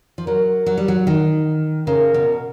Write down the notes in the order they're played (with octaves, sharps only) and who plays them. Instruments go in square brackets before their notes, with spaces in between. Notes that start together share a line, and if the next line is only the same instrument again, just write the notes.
[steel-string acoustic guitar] F3
[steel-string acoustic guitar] F#3 [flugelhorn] A#4
[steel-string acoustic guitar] F#3
G3
F#3
D#3
[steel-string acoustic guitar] C#3 [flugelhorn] A#4
[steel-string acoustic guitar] B2